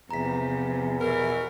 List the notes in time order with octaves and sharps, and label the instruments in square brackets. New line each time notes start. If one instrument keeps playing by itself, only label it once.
[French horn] E2 [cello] C3 F3 [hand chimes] A#5 B6
[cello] B2 E3 [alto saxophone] A#4